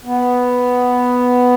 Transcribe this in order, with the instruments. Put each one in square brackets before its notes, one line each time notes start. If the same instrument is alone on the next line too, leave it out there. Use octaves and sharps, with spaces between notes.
[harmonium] B3